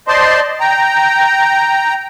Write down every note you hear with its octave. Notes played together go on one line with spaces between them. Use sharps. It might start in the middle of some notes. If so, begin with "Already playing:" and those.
C5 D5 D#5 A5 C6
G5 A#5